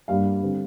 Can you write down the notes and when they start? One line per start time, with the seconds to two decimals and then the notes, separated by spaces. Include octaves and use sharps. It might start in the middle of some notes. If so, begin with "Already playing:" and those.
0.08 G2 G3 A#3 D4 F5
0.42 D3 G3 C4